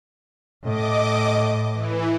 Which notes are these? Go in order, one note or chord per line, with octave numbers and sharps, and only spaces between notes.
A2 D#5 D6
E3